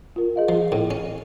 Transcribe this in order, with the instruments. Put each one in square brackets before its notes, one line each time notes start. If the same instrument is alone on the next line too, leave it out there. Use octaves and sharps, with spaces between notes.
[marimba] F4 A#4
G#4 D#5 F5
[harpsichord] F3
A2
C#4